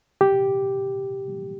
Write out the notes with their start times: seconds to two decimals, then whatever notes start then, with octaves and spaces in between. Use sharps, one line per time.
0.21 G4